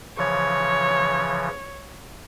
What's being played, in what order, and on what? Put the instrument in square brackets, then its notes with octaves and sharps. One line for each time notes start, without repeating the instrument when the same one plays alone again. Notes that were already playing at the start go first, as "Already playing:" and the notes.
[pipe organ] C#3 E3 F3 [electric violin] C#5